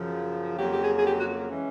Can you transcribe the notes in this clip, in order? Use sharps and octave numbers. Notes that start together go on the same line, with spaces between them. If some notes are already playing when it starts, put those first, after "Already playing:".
Already playing: F#2 C#3 F3
F2 C#3 F#3 A#3 G4
G4
G#4
G#4
G4
F#4
E3 G#3 C#4